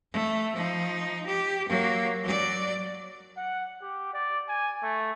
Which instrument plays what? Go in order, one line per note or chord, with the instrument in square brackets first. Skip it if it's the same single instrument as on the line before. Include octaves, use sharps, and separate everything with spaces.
[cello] A3
F3 D#4
G4
F#3 A#3
F#3 D5
[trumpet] F#5
G4
D5
G#5
A3